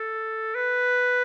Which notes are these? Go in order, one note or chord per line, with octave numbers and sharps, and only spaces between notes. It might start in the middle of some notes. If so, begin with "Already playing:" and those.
Already playing: A4
B4